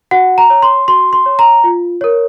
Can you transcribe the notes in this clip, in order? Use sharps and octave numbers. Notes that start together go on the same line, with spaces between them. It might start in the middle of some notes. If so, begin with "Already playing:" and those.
F#4 F#5
A#5
C#5
C6
F#4 C6
C6
C#5
A#5
F4
A#4 C#5